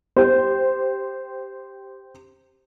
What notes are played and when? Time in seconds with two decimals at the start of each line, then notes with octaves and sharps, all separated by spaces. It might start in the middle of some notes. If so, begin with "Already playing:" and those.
0.16 G4 C5